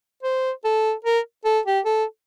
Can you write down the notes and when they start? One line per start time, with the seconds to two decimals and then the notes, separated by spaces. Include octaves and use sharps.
0.23 C5
0.64 A4
1.05 A#4
1.45 A4
1.66 G4
1.85 A4